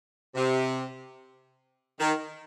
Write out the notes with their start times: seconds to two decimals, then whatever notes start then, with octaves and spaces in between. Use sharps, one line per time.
0.35 C3
2.00 D#3